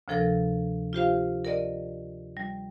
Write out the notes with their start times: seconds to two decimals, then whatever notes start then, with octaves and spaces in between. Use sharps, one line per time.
0.08 D2 C3 F3 A4 A#4 A#6
0.93 F4 G4 C5 F5
1.45 A#4 D5 D#5
2.37 G3